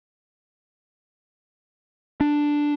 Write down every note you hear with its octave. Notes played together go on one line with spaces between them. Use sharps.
D4